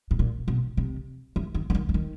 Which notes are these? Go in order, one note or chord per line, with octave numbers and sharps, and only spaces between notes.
A2
A#2
B2
C3
E3
D#3
D3
D#3
E3
D#3